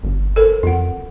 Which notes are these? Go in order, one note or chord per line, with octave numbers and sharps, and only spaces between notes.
G1
A4 A#4 C5
F2 F4 F#5